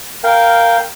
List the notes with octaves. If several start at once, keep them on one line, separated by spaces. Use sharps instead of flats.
A#4 F5 G5